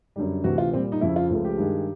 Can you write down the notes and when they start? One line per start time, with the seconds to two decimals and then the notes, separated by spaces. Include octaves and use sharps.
0.16 F#2 D3 G3
0.44 D2 C3 E3 F#4
0.58 F4
0.73 A#2 G3 C4
0.92 D#4
1.01 F2 C#3 F3 E4
1.16 F4
1.30 C#2 C#3 F3 A3
1.45 G4
1.58 G2 D#3 G#3